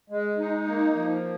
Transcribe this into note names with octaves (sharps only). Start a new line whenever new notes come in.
G#3
D#4
A#3
F3